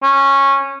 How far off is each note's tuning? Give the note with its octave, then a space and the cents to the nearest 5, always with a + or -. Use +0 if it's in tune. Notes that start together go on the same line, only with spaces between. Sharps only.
C#4 -15